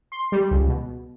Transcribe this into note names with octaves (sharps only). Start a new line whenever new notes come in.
C6
G3
C#2
B2